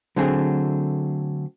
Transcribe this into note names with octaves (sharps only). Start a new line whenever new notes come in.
D3 F#3 A3 C4 G#4